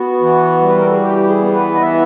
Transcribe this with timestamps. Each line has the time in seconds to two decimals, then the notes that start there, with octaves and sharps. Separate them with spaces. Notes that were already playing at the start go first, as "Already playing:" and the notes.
Already playing: B3 F#4
0.21 E3
0.61 G3
0.69 B4
0.78 A#4
0.86 A4
0.93 G#4
1.01 E3 G4
1.28 G#4
1.41 B3
1.54 B4
1.75 D#5
1.81 E3 E5